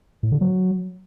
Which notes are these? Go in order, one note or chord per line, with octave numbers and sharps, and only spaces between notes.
A2
D3
F#3